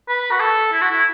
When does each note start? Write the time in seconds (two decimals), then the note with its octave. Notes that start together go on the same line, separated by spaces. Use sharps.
0.09 B4
0.31 F#4
0.40 A4
0.73 E4
0.82 F#4
0.91 E4